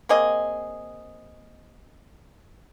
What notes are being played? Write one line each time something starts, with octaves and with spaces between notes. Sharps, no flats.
A#3 C4 G#4 D#5